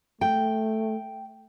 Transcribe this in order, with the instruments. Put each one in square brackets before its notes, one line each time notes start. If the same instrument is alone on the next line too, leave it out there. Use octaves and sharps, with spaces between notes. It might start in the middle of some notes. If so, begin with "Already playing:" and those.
[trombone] A3 [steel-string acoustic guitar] G5